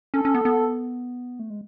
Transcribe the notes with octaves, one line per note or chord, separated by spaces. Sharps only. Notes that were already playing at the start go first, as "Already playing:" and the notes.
C#4 A4
C#4
B3
B3
A3
G#3